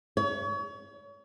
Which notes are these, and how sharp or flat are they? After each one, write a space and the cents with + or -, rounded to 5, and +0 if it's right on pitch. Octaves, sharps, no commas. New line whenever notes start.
C#5 +35